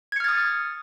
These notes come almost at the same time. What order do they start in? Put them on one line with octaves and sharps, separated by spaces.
G#6 C#7 F6 A6 D#6